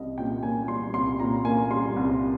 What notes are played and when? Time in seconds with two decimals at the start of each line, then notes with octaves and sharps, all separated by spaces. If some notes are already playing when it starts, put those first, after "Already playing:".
Already playing: C2 G3 D#5
0.18 A#2 G5
0.43 A#3 G#5
0.68 G3 C6
0.94 C2 C6
1.19 A#2 A#5
1.45 A#3 G#5
1.70 G3 C6
1.96 C2